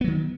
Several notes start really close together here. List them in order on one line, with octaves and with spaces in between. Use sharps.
B3 F#3 D#3